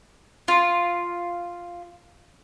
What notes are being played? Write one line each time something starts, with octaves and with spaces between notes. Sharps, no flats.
F4